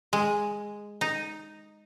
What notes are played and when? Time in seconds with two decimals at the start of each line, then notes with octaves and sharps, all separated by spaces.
0.13 G#3
1.01 D#4